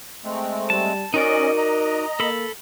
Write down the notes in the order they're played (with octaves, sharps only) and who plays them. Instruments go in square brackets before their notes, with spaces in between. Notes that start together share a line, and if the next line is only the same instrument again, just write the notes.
[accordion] G#3 A3 C4
[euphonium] G3 [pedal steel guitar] A5
[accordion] C#4 D#5 [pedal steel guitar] D#4 F#4 D5 [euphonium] A#4
[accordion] D#5 A#5
[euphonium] A#3 [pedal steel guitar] A4 B5